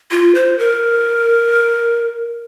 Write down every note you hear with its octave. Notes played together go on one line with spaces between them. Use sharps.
F4
C5
A#4